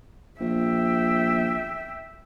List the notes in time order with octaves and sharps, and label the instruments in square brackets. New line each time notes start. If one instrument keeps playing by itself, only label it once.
[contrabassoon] A#1 [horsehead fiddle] E5 G5